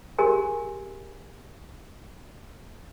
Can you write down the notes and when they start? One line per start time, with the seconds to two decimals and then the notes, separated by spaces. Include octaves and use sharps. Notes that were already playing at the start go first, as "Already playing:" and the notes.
0.18 G4 G#4 A#4 G#5 C6